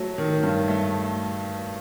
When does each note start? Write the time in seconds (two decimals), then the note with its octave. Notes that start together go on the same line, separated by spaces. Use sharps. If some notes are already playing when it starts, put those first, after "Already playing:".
Already playing: F#3 A3
0.18 D#3
0.43 G2
0.68 A3